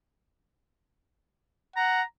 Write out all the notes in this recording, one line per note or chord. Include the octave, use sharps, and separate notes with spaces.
F#5 A#5